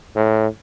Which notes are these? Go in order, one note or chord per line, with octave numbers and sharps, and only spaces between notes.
A2